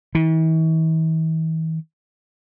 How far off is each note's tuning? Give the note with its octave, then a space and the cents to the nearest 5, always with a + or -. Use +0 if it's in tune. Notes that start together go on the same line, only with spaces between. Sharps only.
E3 -45